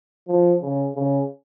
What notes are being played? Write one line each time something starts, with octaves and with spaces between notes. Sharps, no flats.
F3
C#3
C#3